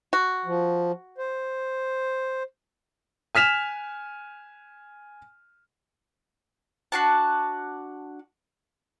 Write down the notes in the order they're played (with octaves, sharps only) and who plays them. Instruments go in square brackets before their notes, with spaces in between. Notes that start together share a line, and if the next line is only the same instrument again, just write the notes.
[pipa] F#4
[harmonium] F3
C5
[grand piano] G#5 F6 B6 E7 F7
[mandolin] D4 F#4 A5